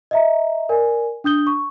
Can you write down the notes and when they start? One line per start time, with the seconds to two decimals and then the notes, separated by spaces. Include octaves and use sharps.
0.11 D#5 E5 A#5
0.69 A#4 D5 G#5
1.24 D4 D#6 G6 G7
1.47 C#6